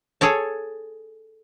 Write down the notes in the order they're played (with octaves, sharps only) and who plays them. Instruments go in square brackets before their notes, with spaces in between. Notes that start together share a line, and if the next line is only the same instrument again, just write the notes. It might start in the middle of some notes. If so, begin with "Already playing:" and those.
[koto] G#4 A4 C#5 A5